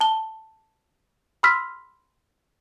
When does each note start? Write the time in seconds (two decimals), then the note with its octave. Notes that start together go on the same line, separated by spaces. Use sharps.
0.01 A5 G7
1.43 B5 C6 E6 F6 B6